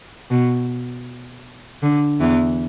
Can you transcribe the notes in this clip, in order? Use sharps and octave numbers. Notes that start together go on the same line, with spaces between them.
B2
D3
E2 E3